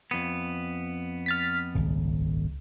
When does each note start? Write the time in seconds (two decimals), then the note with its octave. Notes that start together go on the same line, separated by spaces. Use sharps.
0.11 F2 B3
1.26 F6 A6 B6
1.75 D#1 G#1 C#2